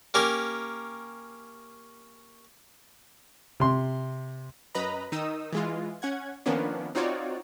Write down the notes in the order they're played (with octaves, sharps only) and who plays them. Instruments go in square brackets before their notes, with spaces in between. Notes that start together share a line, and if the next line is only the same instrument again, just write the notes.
[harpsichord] A#3 C#4 G4 A#4
[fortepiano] C3 C6
[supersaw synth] F#2 B4 D#5 A#5 B5
D#3 D#4 D#6 E6
E3 G#3 F4
C#4 F#5 G#6
D#3 F3 A#3 B3 C#4 D4
C4 D#4 F4 F#4 C#5 D5